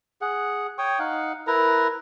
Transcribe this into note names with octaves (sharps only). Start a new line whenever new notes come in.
G#4 F#5
C#5 G5 C#6 D#6
D#4 F5 F#5
E4 A#4 B4 A#5